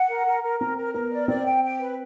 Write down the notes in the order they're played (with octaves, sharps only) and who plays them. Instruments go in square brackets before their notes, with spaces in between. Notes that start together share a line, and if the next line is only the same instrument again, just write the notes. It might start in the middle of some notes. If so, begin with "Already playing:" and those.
Already playing: [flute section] F#5
A#4
A#4
A#4
[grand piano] C4 [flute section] A#4
[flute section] A#4
[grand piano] B3 [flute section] A#4
[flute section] D5
[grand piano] C4 [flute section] D5
[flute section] G5
G5
B4